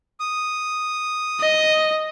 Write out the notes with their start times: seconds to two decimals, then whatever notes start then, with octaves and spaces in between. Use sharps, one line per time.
0.20 D#6
1.41 D#5